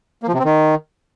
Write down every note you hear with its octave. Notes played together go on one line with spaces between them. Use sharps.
A#3
F3
C3
C4
D#3